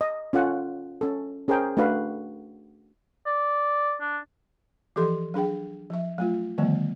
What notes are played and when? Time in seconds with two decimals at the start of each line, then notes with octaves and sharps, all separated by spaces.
0.01 D#5
0.33 C#4 F4 A4 F#5
1.01 C#4 A4
1.48 C#4 G#4 A#4 C5 G5
1.77 A3 D4 F#4 B4 F5
3.27 D5
4.01 D4
4.96 E3 F3 G4 A4 C6
5.34 F#3 D4 G#4 G5
5.90 F3 E5
6.18 F#3 A3 F4
6.58 D3 D#3 F3 G3 A3 B3